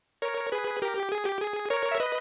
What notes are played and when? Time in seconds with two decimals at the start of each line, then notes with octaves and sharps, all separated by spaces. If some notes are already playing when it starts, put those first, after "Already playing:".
0.22 A#4 C#5
0.52 G#4 B4
0.82 G4 A#4
0.97 G4
1.12 G#4
1.26 G4
1.41 G#4
1.70 A#4 C#5
1.91 E5
2.00 B4 D#5